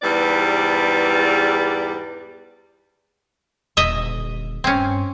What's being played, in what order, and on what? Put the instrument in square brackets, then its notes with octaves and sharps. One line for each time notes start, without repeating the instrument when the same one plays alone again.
[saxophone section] E2 G#2 G3 B4 D5
[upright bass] D#1 D3 [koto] D#5 E5
[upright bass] G2 [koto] C4 C#4